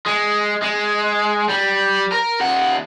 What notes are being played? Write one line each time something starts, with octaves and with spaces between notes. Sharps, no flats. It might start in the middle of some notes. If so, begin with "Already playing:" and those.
G#3
G#3
G3
A#4
D#2 F#5